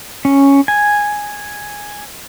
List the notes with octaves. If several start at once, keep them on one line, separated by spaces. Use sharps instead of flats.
C#4
G#5